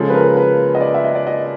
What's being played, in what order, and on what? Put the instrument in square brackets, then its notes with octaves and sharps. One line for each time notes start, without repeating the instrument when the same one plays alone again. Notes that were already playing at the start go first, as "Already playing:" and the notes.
Already playing: [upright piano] C#3 F3 G#3 A4
B4
A#4
B4
D#5
D5
E5
D#5
D5
D#5